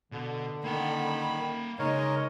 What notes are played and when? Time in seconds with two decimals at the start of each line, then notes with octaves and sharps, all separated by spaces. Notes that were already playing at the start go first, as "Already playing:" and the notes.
0.12 B2 D3
0.64 D#3 A#3 F#5 B5
1.79 C#3 G#3 D#4 A#4 C#5 D#5